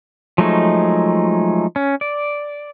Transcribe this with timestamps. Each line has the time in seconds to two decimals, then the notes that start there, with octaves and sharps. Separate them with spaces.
0.38 F3 F#3 G#3 A3 D#4
1.76 C#4
2.01 D5